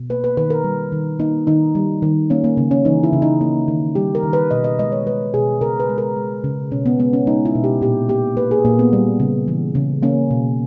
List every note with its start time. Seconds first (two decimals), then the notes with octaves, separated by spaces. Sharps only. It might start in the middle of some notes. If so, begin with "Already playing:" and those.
Already playing: B2
0.10 A#3 B4
0.24 B4
0.37 D#3 B4
0.50 A#4
0.64 G3
0.92 D#3
1.20 A#3 D#4
1.47 D#3 D#4
1.75 G3
2.02 D#3
2.30 A#3 C#4
2.44 A#3
2.57 C#3
2.71 C#4
2.85 E3 D#4
3.04 E4
3.13 C#3
3.22 D#4
3.41 A#3
3.68 D#3
3.95 G3 G4
4.15 A#4
4.23 D#3
4.33 B4
4.51 B2 D#5
4.64 D#5
4.79 G#3 D#5
4.92 C#5
5.06 G#3 B4
5.34 B2 G#4
5.61 C#3 A#4
5.80 B4
5.89 G#3
5.98 A#4
6.16 G#3
6.44 C#3
6.71 B2 C#4
6.86 B3
6.99 G#3 B3
7.13 C#4
7.27 G#3 D#4
7.45 E4
7.55 B2
7.64 G4
7.81 A#2 G4
8.09 A#3 G4
8.37 A#3 B4
8.51 G#4
8.65 A#2 A#3
8.79 B3
8.93 G3
9.20 C#3
9.48 E3
9.75 C#3
10.03 A#3 C#4
10.31 B2